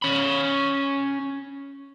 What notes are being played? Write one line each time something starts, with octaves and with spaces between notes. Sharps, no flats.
C#4 B5